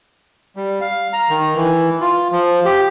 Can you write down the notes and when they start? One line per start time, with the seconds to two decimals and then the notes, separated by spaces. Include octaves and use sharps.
0.56 G3
0.81 F5
1.13 A#5
1.29 D#3
1.56 E3
2.01 F4
2.32 F3
2.65 G4